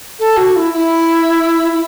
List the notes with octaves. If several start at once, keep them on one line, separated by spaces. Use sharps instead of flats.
A4
F#4
E4
E4
E4